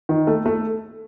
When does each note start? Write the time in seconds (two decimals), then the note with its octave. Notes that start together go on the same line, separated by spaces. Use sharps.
0.09 D#3
0.27 A3
0.46 A3